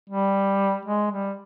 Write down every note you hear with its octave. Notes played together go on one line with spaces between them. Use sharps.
G3
G#3
G3